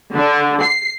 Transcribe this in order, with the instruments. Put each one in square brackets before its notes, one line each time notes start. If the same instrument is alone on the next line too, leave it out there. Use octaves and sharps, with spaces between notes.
[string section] D3
C7